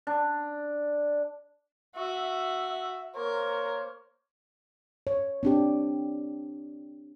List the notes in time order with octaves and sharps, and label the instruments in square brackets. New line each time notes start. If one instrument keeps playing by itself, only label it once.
[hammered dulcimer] D4
[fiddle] F#4 [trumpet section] E5
[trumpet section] A#3 C5 C#5 [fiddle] A#4
[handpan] C#5
C4 D4 G4